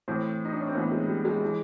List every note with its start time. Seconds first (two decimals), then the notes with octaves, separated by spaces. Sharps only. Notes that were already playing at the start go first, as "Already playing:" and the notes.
0.08 A2 E3 C4
0.45 D#4
0.52 D4
0.60 C#4
0.67 C4
0.75 A2 E3 B3
0.92 G#3
1.08 G3
1.25 G#3
1.45 E3